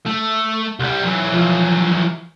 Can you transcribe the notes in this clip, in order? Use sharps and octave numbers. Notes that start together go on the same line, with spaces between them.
A3
C2 G3
E3 F#3
F3